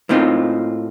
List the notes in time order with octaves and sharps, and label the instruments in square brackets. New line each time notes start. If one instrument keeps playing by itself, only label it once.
[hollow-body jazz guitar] A2 A#3 C4 D#4 F4